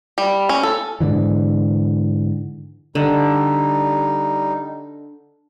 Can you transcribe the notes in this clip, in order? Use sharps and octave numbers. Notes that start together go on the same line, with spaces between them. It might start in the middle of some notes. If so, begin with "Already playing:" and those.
G3
C#4
A4
G#2 D3 E3
D3 G3 D#4